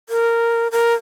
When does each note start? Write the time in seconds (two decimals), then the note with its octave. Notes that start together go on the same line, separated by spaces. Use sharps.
0.09 A#4
0.72 A#4